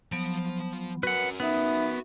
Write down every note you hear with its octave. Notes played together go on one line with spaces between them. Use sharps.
F3 F#3 B3 A5
F#4 A#4 B4 F#5
B3 D#4 E5 B5